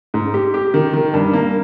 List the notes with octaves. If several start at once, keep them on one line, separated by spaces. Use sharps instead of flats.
G#2
G4
G4
D#3
D#3
G2
A#3